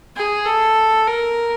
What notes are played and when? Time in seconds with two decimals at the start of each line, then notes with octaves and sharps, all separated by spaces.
0.16 G#4
0.45 A4
1.07 A#4